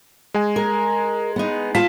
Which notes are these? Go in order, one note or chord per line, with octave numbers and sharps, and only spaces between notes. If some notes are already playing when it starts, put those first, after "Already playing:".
G#3 G#5
A#4
B3 D#4
F4 A5 B6